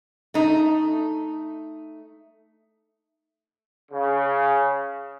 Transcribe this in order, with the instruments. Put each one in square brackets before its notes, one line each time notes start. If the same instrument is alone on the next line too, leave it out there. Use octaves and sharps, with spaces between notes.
[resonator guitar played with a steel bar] A3 D#4
[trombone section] C#3